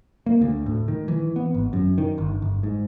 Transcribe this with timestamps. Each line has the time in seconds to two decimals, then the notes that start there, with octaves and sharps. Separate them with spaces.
0.26 A#3
0.41 D2
0.66 A2
0.88 D#3
1.08 E3
1.36 B3
1.54 G#1
1.73 F#2
1.98 D#3
2.18 G1
2.42 G1
2.63 G#2